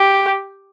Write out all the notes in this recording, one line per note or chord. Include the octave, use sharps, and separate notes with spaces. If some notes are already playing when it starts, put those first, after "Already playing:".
Already playing: G4